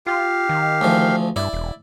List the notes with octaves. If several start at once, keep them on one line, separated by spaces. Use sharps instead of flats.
F4 G4 F5
D#3
D2 E3 F3
G2 E4 D5
E1